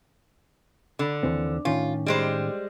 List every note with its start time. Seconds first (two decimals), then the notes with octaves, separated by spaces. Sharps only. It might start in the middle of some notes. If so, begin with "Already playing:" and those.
0.99 D3
1.23 D#2 E3 C4
1.65 A2 D#3 C#4 F4
2.06 G3 G#3 C5